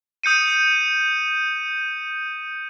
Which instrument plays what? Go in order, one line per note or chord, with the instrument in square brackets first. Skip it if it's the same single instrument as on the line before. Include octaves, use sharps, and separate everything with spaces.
[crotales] D#6 G6 C#7 D#7